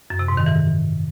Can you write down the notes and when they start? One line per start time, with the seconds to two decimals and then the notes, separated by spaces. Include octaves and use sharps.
0.10 F#2
0.19 C3
0.28 G#2
0.37 D#3
0.46 E3